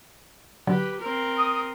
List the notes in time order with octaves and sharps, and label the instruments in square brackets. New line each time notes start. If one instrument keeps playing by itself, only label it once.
[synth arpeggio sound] D3 F#3 [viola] G4 B4
[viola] C4 A#4
[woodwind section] D#6